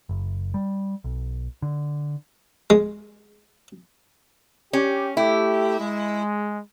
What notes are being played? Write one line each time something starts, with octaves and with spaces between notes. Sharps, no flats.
F#1
G3
B1
D3
G#3
C#4 G4
A3 E4 G4
G#3